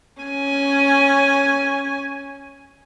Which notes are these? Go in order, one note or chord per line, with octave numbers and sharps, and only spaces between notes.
C#4 G#5